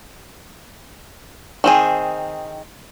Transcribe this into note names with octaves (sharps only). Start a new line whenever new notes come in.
D#3 C4 G#4